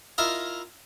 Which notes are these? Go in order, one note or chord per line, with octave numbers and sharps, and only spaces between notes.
E4 F4 A#4 D#5 A#5